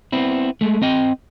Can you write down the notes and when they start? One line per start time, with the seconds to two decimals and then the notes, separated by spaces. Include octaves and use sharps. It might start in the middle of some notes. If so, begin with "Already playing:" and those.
0.12 B3 C4 E4
0.61 G#3 A3
0.82 C4 D#5 G5